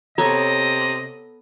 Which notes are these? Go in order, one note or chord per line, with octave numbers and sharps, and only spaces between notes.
C3 B3 A4 C#5 D#5 A#5